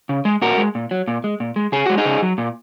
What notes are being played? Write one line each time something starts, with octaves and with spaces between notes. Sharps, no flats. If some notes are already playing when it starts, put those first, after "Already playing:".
C#3
G#3
A#2 F#4 A#4
G#3
A#2
F#3
A#2
G#3
A#2
G#3
C#3 G#4
G#3 F#4
D#4 G#4
C#3
F#3
A#2